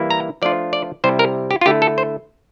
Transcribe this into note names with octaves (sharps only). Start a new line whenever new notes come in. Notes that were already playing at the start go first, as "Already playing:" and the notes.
Already playing: E3 G3 A#3 E4
A#5
F3 A3 D4 F4 D5
D5
C3 G3 C4 E4 C5
A#4
G4
F4
D3 A3 E4 G4
A4
C5